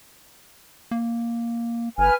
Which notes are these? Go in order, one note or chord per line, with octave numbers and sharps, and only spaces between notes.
A#3
G1 B4 G#5 F6